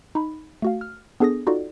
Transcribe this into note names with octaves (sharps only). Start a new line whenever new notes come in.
D#4 B5
A3 F#4 F5
F6
B3 D4 G#4 A4 D#6 A#6
D#4 F4 F#4 A4 D5